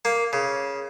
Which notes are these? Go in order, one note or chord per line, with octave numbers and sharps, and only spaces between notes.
A#3
C#3